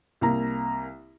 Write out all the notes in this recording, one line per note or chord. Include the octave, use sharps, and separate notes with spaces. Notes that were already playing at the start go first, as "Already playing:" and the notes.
C2 A#3 A#5